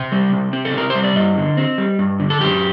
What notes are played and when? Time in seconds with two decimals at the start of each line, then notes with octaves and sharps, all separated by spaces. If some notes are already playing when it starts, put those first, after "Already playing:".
Already playing: C3 G5
0.12 G3
0.33 C3
0.53 C4
0.65 A4
0.74 C3 A#4
0.90 C5
0.95 G3
1.03 D5
1.16 G2 D#5
1.37 D3
1.57 C4
1.78 G3
1.99 G2
2.20 D3
2.30 A4
2.40 F#2 G4